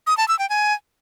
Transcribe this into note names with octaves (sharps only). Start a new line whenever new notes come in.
D#6
A5
E6
G5
G#5